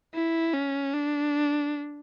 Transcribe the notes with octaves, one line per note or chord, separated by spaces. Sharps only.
E4
C#4
D4